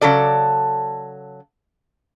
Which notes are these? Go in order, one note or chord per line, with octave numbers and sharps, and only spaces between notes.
C#3 F#3 A4 D5